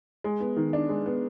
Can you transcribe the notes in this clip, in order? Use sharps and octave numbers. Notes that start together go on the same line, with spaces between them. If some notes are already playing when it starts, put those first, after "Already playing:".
G#3
B3
D#3
D4
G#3
B3